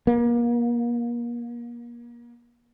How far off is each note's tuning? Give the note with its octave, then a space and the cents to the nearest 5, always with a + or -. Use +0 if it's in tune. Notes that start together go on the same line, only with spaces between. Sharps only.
A#3 +35